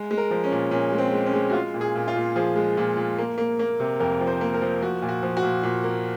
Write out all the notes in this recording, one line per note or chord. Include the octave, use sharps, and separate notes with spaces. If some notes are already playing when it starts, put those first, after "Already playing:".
Already playing: G#3
G#3
A#4
F3
C#4
A#2
A#2 C#4
G#3
C4
G#3
C#4
G#3
F#4
G#3 F4
A#2
G#4
A#2
F4
A#2
F3 G#4
G#3
A#2
A#2
A#3
A#3
A#3
C3
F2 A#4
F3
C5
A#3
A#4
F3
F3 F#4
A#2
F#4
F3
F#4
A#2
A#2
A#3